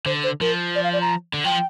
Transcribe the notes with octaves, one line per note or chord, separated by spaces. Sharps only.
D3 C5
C5
F3 A#4
D5
F5
D5
A#5
D3
F3 G5